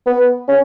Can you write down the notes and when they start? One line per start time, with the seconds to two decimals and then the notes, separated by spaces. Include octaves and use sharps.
0.07 B3
0.48 C#4